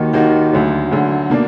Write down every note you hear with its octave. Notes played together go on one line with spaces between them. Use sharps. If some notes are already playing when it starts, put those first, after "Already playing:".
Already playing: D#2 D#3 A#3 D#4 F#4
D#2 D#3 A#3 D#4 F#4
D2 D3 F#3
D2 D3 F#3
B2 A#3 D4